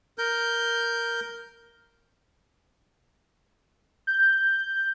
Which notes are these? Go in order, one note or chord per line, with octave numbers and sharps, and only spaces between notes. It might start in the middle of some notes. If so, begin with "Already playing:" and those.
A#4 G6
G6